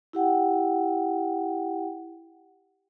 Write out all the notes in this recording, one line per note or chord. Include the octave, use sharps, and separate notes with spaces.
E4 G4 F#5 G5